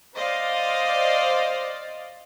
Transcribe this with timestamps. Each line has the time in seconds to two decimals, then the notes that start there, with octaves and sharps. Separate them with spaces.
0.16 C5 D5 D#5 F5